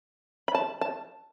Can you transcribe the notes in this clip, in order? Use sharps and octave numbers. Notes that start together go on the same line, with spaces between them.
B5
A5
A5